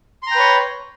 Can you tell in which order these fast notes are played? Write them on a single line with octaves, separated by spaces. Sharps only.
C6 A#5 G5 B4 C#5